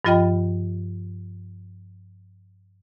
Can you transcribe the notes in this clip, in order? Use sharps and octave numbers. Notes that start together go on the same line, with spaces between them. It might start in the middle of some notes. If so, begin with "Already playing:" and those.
G2 F3 F4 D#5 G5 B5